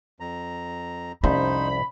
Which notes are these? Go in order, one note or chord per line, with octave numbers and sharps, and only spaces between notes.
F2 A#5
C2 F2 C#4 D#4 C5 B5